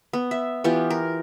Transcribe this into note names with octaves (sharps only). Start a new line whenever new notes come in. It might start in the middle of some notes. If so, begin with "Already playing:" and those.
B3
E5
E3 B3 F4 G4
A#4